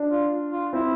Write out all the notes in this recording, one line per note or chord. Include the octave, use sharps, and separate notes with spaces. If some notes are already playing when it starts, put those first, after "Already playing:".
Already playing: D4
F4
F4
C4 E4